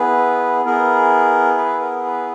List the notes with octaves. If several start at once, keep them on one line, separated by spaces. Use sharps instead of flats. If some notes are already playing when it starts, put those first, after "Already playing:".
Already playing: B3 E4 G#4 B4
B3 E4 G#4 A#4
B4
A#4
B4